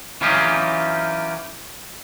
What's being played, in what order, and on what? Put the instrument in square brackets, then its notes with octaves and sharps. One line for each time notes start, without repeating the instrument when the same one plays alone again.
[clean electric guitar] E3 F#3 C#4 D#4 F4 G4